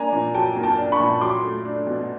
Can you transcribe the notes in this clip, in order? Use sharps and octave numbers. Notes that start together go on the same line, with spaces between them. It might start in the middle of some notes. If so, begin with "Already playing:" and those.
Already playing: A#3 D4 G#5 A#5
A#2
F#3 G5 A5
A#3
G5 A5
D4
B5 C#6
A#2
F#3 C6 D6
A3
D4
B2